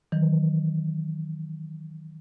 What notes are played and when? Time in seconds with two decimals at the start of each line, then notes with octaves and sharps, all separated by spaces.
0.12 D#3 E3 F#3